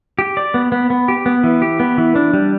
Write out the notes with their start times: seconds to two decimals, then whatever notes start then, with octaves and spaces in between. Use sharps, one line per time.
0.19 G4
0.37 D5
0.54 B3
0.72 B3
0.90 B3
1.08 G4
1.26 B3
1.44 E3
1.62 G4
1.80 B3
1.98 E3
2.16 D4
2.34 G3